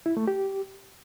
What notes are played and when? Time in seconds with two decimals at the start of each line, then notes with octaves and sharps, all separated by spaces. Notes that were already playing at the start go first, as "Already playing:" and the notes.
0.06 E4
0.17 A3
0.28 G4